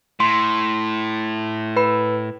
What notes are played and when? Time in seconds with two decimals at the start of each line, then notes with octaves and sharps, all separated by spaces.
0.20 A2 C6
1.76 B4 B5